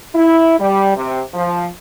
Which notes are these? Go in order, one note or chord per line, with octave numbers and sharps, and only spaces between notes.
E4
G3
C3
F3